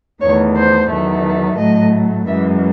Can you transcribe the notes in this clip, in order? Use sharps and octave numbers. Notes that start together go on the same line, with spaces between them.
E2 D#3 A3 C#5
C5
E2 D#3 F#3 A3
A2 F#3 A3 D#5
F#2 E3 G#3 E5